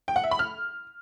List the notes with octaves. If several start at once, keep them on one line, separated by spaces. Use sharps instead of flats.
G5
F#5
E5
B5
F6